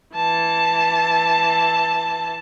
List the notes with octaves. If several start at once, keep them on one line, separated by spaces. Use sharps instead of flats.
E3 A5